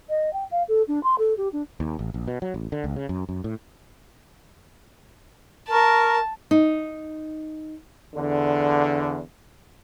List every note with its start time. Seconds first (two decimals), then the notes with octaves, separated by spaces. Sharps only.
0.09 D#5
0.33 G5
0.51 F5
0.68 A4
0.88 D4
1.03 C6
1.18 A4
1.37 G4
1.53 D4
1.80 D#2
1.99 A1
2.14 A#1
2.27 B2
2.42 F#3
2.54 A1
2.72 D3
2.84 C#2
2.96 C#3
3.09 F#2
3.29 F#2
3.44 A2
5.69 A#4 A5 C#6
6.51 D#4
8.15 E2 D3